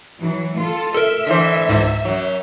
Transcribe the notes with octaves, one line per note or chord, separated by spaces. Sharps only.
E3 F#3
F4 A4
A4 A#4 E5
D3 E3 C5
C#2 G#2
F#2 F#3